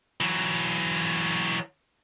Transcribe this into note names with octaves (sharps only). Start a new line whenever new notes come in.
E3 F#3